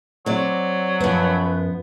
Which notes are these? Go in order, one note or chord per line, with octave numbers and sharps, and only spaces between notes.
F#3 C4 D5
F#2 F3 B3 B4